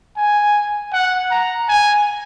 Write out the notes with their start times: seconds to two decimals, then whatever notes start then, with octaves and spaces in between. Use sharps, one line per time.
0.17 G#5
0.93 F#5
1.31 A#5
1.68 G#5